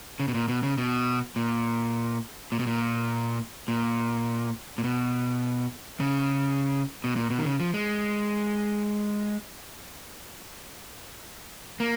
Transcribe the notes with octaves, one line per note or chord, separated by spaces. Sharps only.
C#3
B2
A#2
B2
C#3
B2
A#2
A#2
B2
A#2
A#2
A#2
B2
C#3
B2
A#2
B2
D#3
C#3
F3
G#3
A#3